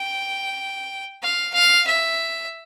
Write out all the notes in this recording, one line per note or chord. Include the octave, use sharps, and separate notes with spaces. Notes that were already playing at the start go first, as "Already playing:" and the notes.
Already playing: G5
F5
F5
E5